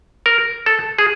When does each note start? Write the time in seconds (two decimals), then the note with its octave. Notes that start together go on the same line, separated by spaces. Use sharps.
0.26 A#4
0.66 A4
0.98 G#4